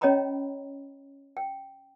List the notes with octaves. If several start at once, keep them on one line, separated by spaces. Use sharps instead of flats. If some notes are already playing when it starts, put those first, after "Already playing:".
C#4 C#5 D#5 G5 A#5 B5
G5